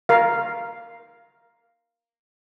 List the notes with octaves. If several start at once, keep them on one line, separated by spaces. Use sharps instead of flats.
A#4 F5